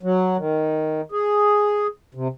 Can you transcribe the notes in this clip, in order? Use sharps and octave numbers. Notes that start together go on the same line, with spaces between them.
F#3
D#3
G#4
C3